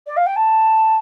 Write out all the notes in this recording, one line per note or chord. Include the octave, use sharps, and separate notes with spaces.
D5
F5
G5
A5